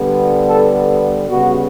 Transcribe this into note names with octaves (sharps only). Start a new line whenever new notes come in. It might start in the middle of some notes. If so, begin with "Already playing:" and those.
Already playing: D3 G3 B3
A4
C#3 G3 B3 F#4